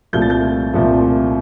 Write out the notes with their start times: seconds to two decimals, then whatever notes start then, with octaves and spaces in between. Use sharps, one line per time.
0.13 C2 A#2 F3 A3 G6
0.22 A6
0.30 G6
0.73 C2 A#2 F3 A3